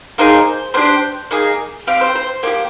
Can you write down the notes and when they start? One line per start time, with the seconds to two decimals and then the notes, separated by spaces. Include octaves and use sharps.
0.18 A#3 D#4 G#4 C5
0.74 A#3 C5
0.77 D4 G4
1.31 A#3 D#4 G#4
1.87 C4 G4 F5
2.01 C5
2.16 C5
2.43 A#3 D4 G4 C5